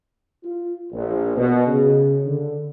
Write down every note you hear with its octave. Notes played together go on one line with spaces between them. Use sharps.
F4
A#1
B2
C#3
D3